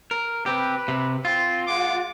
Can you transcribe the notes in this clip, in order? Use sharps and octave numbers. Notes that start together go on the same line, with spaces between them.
A#4
C4 G4 B4
C3
C4 F4
G#3 F#5 D6